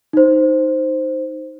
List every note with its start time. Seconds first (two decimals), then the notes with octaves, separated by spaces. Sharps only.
0.13 D#4 C5